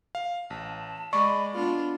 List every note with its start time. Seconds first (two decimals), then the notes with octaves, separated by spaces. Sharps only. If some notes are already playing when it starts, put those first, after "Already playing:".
0.15 F5
0.50 A1 A5
1.13 G#3 D5 B5 C#6
1.54 B3 D4 F4 B5